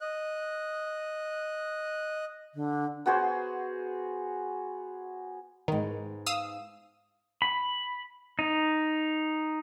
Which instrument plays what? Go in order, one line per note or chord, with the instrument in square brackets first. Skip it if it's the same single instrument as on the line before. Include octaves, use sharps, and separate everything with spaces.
[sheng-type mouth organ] D#5 F#6
[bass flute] D3
[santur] B3 F#4 G#4 C5
[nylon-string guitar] G#2 B3 [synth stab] D#3
[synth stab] F5 D#6 E6
[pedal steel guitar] B5
D#4